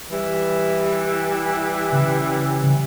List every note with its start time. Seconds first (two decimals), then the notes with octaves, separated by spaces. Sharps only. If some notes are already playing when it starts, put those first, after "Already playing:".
0.11 E3 G3
1.93 C#3